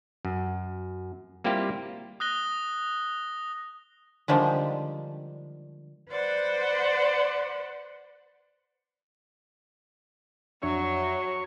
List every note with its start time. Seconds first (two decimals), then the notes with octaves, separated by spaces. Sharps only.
0.25 F#2
1.44 G3 A#3 C4 E4 F4 G4
2.20 D#6 F#6 A#6 G7
4.28 D3 D#3 F3 G3 G#3
6.10 B4 C5 D5 F#5
10.63 F2 F#3 D4 C#5 E5